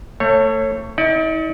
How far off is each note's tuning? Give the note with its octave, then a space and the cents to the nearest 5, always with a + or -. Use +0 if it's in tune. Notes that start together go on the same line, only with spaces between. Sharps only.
A3 +25 C#5 -15
D#4 +45 D5 +5